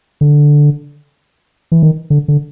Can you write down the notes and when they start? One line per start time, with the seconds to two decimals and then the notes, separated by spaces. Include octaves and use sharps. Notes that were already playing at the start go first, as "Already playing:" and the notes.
0.21 D3
1.72 E3
1.83 D#3
2.10 D3
2.28 D3